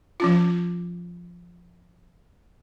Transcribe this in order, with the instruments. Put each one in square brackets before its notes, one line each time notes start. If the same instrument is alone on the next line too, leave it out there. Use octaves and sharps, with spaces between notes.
[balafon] F3 C#4 F4